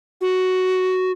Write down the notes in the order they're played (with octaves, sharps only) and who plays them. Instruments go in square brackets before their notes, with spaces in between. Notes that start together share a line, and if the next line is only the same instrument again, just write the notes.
[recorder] F#4